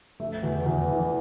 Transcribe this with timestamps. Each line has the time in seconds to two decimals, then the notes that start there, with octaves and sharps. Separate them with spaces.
0.20 A3
0.43 E2
0.66 E2
0.90 E3